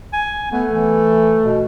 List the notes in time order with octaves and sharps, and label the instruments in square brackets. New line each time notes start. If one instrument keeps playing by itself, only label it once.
[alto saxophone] G#5
[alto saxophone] A3 [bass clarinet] B3
[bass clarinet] E3
B2